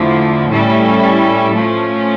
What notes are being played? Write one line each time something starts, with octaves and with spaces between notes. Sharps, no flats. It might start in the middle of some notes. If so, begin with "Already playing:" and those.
Already playing: E2 D3 F3 A3 E4
A2 G3 C#4 E4 A4
F3 A3 C#4